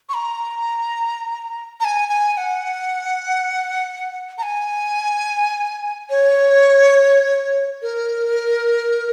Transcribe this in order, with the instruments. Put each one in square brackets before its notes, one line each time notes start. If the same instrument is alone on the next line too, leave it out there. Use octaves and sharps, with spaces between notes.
[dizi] C#6
A#5
A#5
G#5
G#5
F#5
A#5
G#5
C#5
A#4